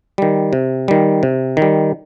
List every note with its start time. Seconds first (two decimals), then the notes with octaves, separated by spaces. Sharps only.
0.18 D#3 G3
0.53 C3
0.88 D#3 G3
1.23 C3
1.57 D#3 G3